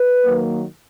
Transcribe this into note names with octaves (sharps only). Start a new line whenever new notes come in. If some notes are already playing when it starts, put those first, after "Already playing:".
Already playing: B4
D#3 F#3 A#3